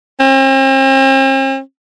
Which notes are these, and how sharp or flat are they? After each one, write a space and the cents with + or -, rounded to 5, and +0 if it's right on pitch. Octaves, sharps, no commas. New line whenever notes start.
C4 +45